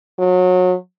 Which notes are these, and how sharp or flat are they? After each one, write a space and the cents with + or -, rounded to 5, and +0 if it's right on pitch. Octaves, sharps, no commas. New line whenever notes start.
F#3 -25